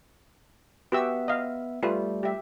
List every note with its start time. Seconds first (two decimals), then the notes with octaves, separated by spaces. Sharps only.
0.92 B3 F#4 G4 E5 E6
1.28 D#5 F5
1.83 G3 A3 F4 B4
2.23 G4 E5